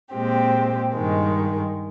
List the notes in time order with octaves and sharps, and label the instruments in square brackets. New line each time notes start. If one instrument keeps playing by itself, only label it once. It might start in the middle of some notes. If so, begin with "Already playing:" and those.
[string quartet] A#2 G#3 C4 G4
G2 D#3 G#3